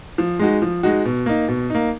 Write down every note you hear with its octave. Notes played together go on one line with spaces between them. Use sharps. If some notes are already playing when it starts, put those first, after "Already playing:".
F3
G#3 D#4 F#4
F3
G#3 D#4 F#4
B2
A#3 D#4
B2
A#3 D#4